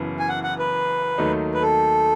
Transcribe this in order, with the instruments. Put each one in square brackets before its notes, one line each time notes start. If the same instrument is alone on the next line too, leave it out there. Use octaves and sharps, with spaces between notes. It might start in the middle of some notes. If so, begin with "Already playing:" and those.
Already playing: [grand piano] F#1 F#2 E3 B3 E4
[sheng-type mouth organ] G#5
F#5
F#5
B4
[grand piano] D#2 D#3 F#3 A3 D#4
[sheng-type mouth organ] B4
A4